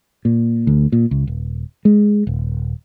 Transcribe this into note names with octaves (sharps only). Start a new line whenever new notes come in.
A#2
D2
A#2
C#2
D#1
G#3
D#1